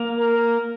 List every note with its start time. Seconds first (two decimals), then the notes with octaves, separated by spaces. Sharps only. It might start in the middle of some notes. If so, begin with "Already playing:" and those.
Already playing: A#3
0.18 A#4